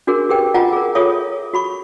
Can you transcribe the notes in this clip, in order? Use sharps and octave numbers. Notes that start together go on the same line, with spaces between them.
D4 F#4 G#4 A#4
G4 G#4 A#4 B4 G5
F4 D#5 F#5 G#5 A#5
G#4 A#4
F4 G#4 A4 C#5 E5 D#6
F#4 B5 C#6